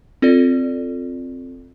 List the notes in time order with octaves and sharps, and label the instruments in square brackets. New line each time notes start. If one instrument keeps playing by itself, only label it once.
[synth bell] C4 F4 A4 D5